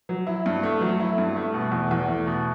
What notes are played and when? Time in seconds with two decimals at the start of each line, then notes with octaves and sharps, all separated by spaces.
0.09 F#3
0.27 E4
0.46 G2
0.63 A3
0.81 F#3
1.00 E4
1.18 G2
1.36 A3
1.54 B2
1.72 E2
1.91 E2
2.08 A3
2.27 B2